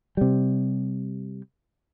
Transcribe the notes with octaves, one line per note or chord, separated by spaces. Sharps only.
C3 G3